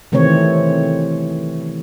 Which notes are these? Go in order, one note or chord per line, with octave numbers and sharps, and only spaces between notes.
C3 D#3 E3 A3 C4 C#5